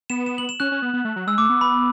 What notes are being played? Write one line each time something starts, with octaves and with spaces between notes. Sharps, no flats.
B3 E7
E7
F#7
E7
C#4 F#6
C#4
B3
B3
A3
F#3
G#3 E6
A3 D6
B3
B5